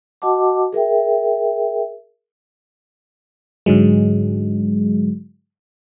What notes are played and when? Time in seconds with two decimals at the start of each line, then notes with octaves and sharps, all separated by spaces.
0.22 F#4 D#5 F#5 A5 D6
0.73 G#4 A#4 E5 G5
3.66 G#2 D3 F#3 G#3